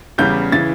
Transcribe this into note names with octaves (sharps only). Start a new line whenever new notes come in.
E2 C#3 G3 G6
C#3 E3 A6